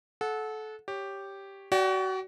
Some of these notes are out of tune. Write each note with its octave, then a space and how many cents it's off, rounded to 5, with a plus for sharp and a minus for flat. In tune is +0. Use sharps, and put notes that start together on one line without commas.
A4 -25 F#5 -15
G4 +0 C#5 +0
F#4 +30 D5 -20 G5 +0